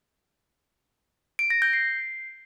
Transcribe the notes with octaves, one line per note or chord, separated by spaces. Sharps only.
D7
A#6
G6
C7